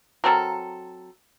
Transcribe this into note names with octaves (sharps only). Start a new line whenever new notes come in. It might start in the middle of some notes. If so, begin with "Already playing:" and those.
F#3 C4 A4 A#4